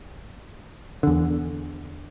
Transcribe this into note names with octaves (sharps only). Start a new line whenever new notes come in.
E2 D3